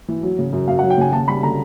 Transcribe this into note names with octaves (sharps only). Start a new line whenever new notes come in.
E3
F#3
C#3
F#2
F#2 F5
F#5
F#3
G5
C#3 G#5
D#2 A5
G3 B5
D3 A#5